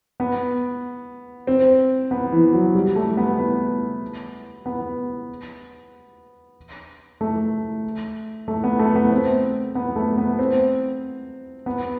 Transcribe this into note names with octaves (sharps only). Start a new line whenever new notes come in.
B3
C4
B3
E3
F#3
G3
A3
B3
B3
B3
A3
A3
B3
A3
B3
C4
B3
A3
B3
C4
B3